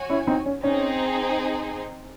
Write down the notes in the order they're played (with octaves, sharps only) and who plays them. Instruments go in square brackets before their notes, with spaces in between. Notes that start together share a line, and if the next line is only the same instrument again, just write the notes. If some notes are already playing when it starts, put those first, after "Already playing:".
Already playing: [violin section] F#4 C#5 G#5
[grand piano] C#4 E4
C4 D#4
C#4
[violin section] C4 D#4 G#4 [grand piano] C#4